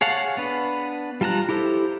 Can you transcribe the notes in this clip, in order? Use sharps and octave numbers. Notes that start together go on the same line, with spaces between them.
G#4 C#5 F5 F#5 A5
B3 D4 B4
G3 F4 A5 A#5 F#6
E4 G4 A4 C5